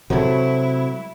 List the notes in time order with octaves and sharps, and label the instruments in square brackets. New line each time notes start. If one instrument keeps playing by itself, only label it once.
[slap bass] C3 [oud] F#3 A3 [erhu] E4